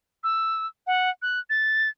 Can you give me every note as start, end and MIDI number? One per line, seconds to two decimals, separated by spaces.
0.24 0.66 88
0.87 1.10 78
1.22 1.40 90
1.50 1.89 93